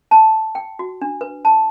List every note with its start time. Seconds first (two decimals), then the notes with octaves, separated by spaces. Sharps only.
0.11 A5
0.55 G5
0.79 F#4
1.02 D4
1.21 B4
1.45 A5